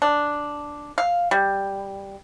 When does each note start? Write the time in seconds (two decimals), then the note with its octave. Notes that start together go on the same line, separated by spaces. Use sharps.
0.02 D4
0.98 F5
1.31 G3